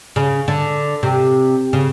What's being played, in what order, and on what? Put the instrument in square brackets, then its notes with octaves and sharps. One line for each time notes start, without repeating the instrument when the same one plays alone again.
[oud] C#3
D3
C3
C#3